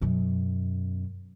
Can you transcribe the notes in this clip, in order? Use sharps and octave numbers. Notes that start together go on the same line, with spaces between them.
F#2 B2